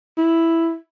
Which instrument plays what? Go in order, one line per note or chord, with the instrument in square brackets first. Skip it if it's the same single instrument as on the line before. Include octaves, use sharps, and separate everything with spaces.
[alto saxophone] E4